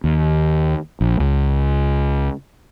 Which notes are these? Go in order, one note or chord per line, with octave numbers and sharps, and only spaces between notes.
D#2
A#1
C#2